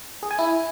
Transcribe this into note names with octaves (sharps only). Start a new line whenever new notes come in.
G#4
G#5
E4